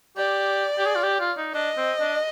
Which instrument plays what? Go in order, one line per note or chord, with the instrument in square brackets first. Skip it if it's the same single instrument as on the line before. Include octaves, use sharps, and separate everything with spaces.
[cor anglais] G4 [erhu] D5
[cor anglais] G4
G#4
F4
G4
F4
D#4
[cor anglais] D4 [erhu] D#5
[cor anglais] C4
D4